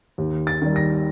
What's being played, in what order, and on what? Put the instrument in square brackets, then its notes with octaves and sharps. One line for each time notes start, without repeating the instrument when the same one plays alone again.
[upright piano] D#2
A6
D#3 G3
A#6